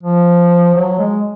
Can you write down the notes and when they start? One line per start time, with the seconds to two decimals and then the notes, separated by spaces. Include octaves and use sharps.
0.03 F3
0.74 F#3
0.98 G#3